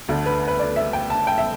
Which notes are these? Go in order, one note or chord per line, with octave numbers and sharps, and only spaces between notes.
D2 D3 A3
B4
B4
D5
E5
G5
A5
G5
E5